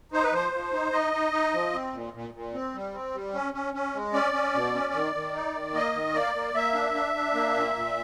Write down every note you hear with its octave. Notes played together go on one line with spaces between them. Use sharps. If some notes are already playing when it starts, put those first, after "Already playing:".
D#4 C5
B4
F3 C5
F3
D#4
D#4 D#5
D#4
D#4
F3
C4
A#2
A#2
A#2
C4
G3
C4
G3
C#4
C#4
C#4
G#3
C#4 D5
C#4
B2
C#4
D#3
D#3
D#4
D#3
A#3 D#5
D#3
A#3 D5
A#3
A#3 E5
D4
D4
D4
A#3
A#2
A#2